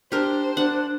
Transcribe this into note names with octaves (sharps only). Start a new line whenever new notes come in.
D4 G4 A#4 C5
D4 F#5